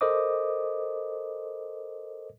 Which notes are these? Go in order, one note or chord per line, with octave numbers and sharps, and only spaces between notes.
A4 A#4 C5 D#5 D6 D#6